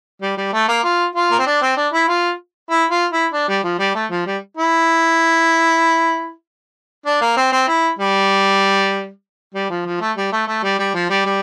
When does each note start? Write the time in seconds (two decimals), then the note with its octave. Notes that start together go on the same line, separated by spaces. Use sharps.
0.22 G3
0.37 G3
0.53 A3
0.68 A#3
0.84 F4
1.15 F4
1.31 A#3
1.38 C4
1.47 D4
1.62 C4
1.77 D4
1.93 E4
2.08 F4
2.70 E4
2.91 F4
3.12 E4
3.33 D4
3.48 G3
3.64 F3
3.79 G3
3.95 A3
4.11 F3
4.26 G3
4.57 E4
7.06 D4
7.21 A#3
7.37 C4
7.52 C4
7.68 E4
7.99 G3
9.55 G3
9.70 F3
9.86 F3
10.01 A3
10.17 G3
10.33 A3
10.48 A3
10.63 G3
10.79 G3
10.94 F3
11.10 G3
11.26 G3